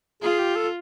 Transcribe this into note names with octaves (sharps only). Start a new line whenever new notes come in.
F4 G#4
G4
A4